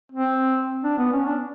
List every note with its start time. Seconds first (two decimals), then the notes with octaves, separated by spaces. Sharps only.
0.12 C4
0.84 D4
0.98 B3
1.12 C#4
1.26 D4